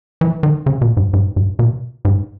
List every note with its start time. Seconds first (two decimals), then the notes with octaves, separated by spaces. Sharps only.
0.21 E3
0.43 D#3
0.66 C#3
0.81 B2
0.97 G#2
1.13 G#2
1.36 G#2
1.59 B2
2.05 G#2